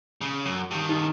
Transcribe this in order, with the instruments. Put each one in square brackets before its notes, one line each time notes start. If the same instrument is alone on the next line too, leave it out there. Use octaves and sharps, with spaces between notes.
[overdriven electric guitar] C#3
F#2
G2 D#3
[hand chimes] D#4